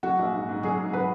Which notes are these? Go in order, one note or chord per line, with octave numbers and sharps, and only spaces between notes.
F#3 F#4
A#1
G#2
G#2
F#3 G#4
G#2
F#3 B4